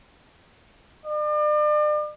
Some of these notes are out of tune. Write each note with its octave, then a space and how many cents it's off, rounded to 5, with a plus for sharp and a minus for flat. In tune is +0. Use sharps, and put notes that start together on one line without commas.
D5 +40